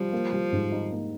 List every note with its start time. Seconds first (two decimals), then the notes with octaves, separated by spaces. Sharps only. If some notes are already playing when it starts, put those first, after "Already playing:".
Already playing: F3 G3
0.12 A#3
0.32 G3
0.52 G#2
0.72 D#4
0.92 A#3